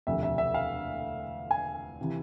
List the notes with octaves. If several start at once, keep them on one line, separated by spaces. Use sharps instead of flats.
E1 D2 C3 F3 E5
E5
E5
F5
G#5
C3 E3